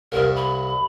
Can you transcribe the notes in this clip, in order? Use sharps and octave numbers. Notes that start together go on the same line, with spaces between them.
C2 G2 A#4
B5